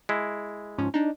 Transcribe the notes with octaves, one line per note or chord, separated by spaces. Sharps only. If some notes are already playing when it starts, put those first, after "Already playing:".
G#3 E4
G#2 F3 C#4
D4 D#4